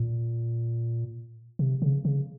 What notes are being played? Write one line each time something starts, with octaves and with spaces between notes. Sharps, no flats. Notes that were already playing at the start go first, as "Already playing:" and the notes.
Already playing: A#2
C3
C#3
C#3